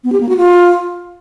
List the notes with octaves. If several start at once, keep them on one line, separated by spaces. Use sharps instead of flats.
B3
G4
A#3
F#4
F4